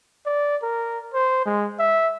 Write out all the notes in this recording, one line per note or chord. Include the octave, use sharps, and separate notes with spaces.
D5
A#4
C5
G#3
E5